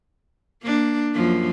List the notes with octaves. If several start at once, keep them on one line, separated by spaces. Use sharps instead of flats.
A#3 D4
F#2 F3 A#3